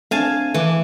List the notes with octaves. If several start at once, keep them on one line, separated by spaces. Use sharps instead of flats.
A3 C4 D4 F5 G#5 A5
E3 A3 D6